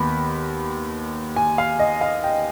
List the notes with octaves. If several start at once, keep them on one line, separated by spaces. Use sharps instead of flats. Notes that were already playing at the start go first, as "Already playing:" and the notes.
Already playing: D#2 D#3 B3 B5
G#5
F5
D#5
F5
G5